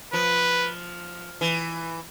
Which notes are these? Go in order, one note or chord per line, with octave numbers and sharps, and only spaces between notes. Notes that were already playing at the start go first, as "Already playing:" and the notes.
F3 B4
E3